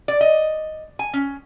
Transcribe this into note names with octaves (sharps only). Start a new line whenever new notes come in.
D5
D#5
G#5
C#4